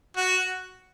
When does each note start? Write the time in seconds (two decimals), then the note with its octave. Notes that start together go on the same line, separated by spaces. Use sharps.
0.17 F#4